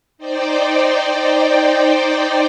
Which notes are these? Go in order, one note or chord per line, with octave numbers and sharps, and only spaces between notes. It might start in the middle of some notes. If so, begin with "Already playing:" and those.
D#4 C5 D5 G5